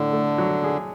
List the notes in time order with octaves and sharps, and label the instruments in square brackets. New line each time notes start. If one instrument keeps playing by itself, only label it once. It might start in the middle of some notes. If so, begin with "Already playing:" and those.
Already playing: [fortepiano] A2 [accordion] D3
[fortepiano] A3
F#3
G#4